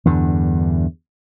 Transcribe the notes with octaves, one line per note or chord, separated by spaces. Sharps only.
E2 G2 D3